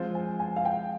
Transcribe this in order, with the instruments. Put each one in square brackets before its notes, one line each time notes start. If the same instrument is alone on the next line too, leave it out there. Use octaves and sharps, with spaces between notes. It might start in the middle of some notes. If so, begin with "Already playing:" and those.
Already playing: [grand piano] F3 G#3 C4 F4 C5
[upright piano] G#5
G#5
F5
G5